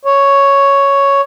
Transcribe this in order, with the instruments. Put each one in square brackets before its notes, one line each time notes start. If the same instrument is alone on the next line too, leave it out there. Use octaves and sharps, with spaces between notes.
[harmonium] C#5